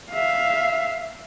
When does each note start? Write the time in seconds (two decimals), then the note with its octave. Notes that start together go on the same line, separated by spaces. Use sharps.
0.11 E5 F5